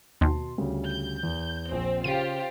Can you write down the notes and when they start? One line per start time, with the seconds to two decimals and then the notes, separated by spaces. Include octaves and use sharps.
0.21 D#2 B2 A5 C6
0.58 D2 C#3 G3
0.88 G6
1.23 E2
1.72 A#1 C4
2.04 C#3 F4 G4 C5 D#7